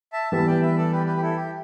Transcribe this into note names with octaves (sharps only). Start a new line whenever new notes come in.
E5 A5
E3 G3 B3 E5 A5
D5 G5
B4 E5
A4 D5
G4 B4
G4 B4
G4
E4 A4
G4